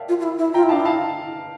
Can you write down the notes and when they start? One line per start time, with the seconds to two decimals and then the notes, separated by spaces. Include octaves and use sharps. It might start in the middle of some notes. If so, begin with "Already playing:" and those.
Already playing: A#4 C#5 D5 E5 F5 G5 A5
0.09 F4
0.20 F4
0.23 E4
0.38 E4
0.54 F4 G5 A#5
0.63 E4
0.69 D4 F5 A5
0.80 E4 F5 A5